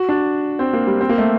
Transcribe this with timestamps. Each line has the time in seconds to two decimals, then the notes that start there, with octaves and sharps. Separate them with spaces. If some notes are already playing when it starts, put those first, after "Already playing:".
Already playing: F#4
0.09 D4
0.59 C4
0.73 A#3
0.87 G3
1.01 C4
1.09 A#3
1.18 A3